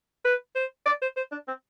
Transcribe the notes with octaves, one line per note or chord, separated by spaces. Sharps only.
B4
C5
D5
C5
C5
D4
C4